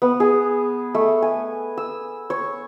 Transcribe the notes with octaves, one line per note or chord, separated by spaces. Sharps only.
B3
G#4
A3
G#5
E6
C#5